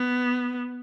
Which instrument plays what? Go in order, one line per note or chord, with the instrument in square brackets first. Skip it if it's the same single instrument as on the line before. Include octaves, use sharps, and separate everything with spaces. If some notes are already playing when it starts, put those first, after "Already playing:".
Already playing: [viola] B3